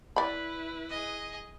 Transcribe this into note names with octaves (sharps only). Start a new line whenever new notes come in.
E4 B4 D5 B5
G#4 D#5